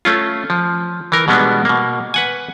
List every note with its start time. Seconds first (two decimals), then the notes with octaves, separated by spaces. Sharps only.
0.05 A3 C#4 F4
0.50 F3
1.12 E3 A#4
1.28 B2 G3 G#3 B3 D4
1.65 B2 A#3
2.14 B4 F#5 G#5